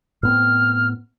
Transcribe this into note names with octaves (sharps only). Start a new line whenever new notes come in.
A2 B3 C4 F6